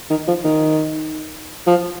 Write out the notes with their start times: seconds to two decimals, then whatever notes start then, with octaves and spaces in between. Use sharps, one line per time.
0.10 D#3
0.28 F3
0.45 D#3
1.67 F3